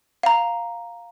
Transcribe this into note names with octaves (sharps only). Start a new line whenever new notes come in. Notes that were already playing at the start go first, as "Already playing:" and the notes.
F5 A#5